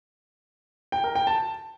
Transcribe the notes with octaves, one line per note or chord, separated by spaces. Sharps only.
G5
A#4
G5
A5